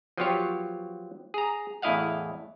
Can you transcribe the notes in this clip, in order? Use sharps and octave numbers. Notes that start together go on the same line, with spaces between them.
F3 F#3 B3 F4 G4 C#5
G#4 A#5
E2 A2 E4 D#5 F5 F#5